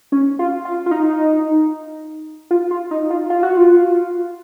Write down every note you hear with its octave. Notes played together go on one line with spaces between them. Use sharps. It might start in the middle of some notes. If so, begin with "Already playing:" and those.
C#4
F4
F4
F4
D#4
F4
F4
D#4
F4
F4
F#4
F4